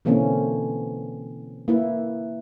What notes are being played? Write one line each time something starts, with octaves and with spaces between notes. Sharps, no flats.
B2 D3 E3 A#3 C4 C#4
A#3 E4 B4